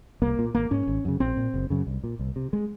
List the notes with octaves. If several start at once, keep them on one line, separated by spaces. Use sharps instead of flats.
C2 A#3
A#2
G#1 A#3
G#2 C#4
G#1
F#2 C#3
A#1 C4
A#2
F#1
F#2 C#3
C2
A#2
C2
C3
G#3